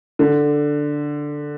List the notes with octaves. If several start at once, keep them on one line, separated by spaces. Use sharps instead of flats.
D3